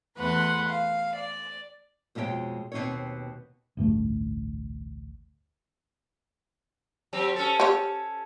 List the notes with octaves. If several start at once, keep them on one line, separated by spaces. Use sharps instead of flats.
E2 A3 B4 F#5 C6
F5
D5
F2 B2 G#3 G4 C#5 G5
D#2 B2 F3 C4 D#4 C#5
A1 D2 G2 A3
F#3 C4 G4
C#4 A4
G4 C#5